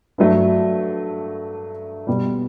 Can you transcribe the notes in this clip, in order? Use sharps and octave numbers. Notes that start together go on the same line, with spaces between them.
G2 F#3 A3
B2 G3